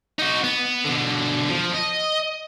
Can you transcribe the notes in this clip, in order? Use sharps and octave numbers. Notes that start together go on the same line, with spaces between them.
D#4 F#4
B3
B2 D3
F3
D#5